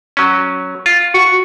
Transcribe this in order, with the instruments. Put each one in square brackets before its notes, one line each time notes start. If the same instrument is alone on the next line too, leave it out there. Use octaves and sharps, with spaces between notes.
[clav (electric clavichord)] F#3 C#4
F4
[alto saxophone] F#4